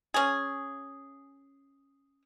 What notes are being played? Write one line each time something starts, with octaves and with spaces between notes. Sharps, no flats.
C#4 G#4